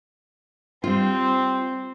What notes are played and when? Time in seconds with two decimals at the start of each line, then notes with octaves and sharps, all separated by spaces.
0.84 G3 C4 F4